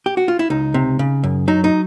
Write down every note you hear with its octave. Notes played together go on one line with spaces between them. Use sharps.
G4
F#4
F4
E4
C#2 D#4
C3
C#3
F#2
F#3 D#4
D#4